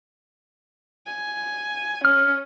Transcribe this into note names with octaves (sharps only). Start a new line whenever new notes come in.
G#5
C#4 F6